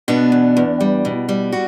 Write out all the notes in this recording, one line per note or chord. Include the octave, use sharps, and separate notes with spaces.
B2 B3 D4
E2
E2
G3
B2
G3
F#4